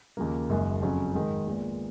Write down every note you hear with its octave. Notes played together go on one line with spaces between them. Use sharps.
D#2 C#3 F3 A#3
F#1 F#2 D#3 G#3
F2 C#3 F#3 C#4
G#2 D#3 G#3
A#1 A#2 G#3 B3